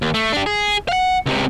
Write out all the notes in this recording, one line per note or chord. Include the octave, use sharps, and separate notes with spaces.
D#2
A3
D4 G4
G#4
F5 F#5
C#2 C3